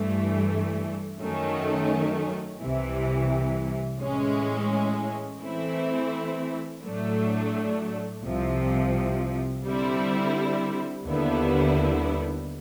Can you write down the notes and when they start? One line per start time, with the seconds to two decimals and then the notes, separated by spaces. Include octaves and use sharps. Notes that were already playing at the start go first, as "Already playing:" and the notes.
Already playing: G2 E3 A3
1.18 F#2 D#3 F#3 A3 C#4
2.60 C2 C3 E3
4.01 A2 E3 G#3 C#4
5.42 E3 A3 C4 E4
6.83 A2 F#3 A3 D4
8.23 C2 C3 F3
9.65 D3 G3 C4 E4
11.05 D#2 D3 G3 B3 E4